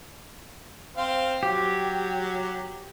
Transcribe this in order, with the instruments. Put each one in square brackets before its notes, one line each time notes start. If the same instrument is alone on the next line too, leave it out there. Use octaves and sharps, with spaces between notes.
[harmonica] C4 C5 F5
[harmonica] F#3 [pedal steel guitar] G4